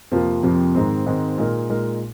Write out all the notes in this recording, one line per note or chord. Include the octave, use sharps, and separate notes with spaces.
F2 C3 F3 A#3 F4
F2 C3 F3 A#3 F4
G#2 D#3 G#3 C4
G#2 D#3 G#3 C4
A#2 G#3 D#4 A#4
A#2 G#3 D#4 A#4